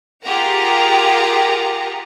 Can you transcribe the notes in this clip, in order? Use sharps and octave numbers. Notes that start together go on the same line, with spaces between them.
F4 G4 G#4 A#4 F#5 A#5